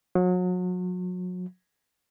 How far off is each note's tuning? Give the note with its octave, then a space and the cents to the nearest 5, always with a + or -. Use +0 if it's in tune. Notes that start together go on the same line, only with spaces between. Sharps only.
F#3 -35